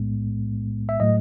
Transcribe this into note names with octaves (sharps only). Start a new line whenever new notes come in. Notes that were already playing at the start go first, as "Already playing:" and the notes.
Already playing: B1 A2 G#3 B3
E5
A2 F#3 A3 D#5